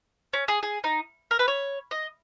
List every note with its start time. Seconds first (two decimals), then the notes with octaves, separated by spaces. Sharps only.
0.33 C#4
0.48 G#4
0.63 G#4
0.84 D#4
1.31 A#4
1.39 B4
1.48 C#5
1.91 D#5